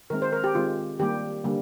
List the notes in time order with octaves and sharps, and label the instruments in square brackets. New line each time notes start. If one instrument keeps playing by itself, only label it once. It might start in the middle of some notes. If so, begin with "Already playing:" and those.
[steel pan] D#3 G#3 C4 A#4
C5
A#4
G4
D#3 G#3 C4 F4
D#3 G3 A#3 G4
D3 G3 A#3